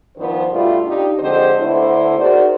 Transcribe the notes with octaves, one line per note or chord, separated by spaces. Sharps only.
G2 D#3 F3 B3 C5
G2 B2 G3 A3 F4
D4 D#4 F4 G4
F2 D3 G#3 G4 C5 D#5
D2 D3 A3 B3 E4 C5
D#4 F#4 G#4 A#4 C5 D5